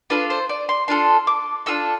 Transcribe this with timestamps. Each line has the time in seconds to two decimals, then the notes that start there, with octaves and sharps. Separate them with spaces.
0.10 D4 F4 A4 B4
0.30 C5
0.49 D5
0.69 C6
0.88 D4 F4 A4 C6
1.27 D6
1.66 D4 F4 A4 E6